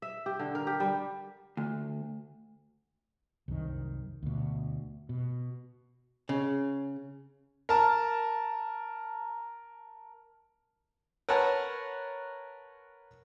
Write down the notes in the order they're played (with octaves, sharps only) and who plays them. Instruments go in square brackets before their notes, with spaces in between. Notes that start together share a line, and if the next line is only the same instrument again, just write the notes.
[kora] E5
G4
D3
A#4
G4
G3
[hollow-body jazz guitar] D2
[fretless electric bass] C2 F#2 D#3
D2 B2
B2
[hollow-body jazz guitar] C#3
[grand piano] A#4 A5 A#5
[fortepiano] A#4 B4 C#5 F#5 A5